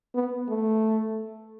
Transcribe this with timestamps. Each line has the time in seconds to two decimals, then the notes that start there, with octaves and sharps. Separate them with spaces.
0.15 B3
0.49 A3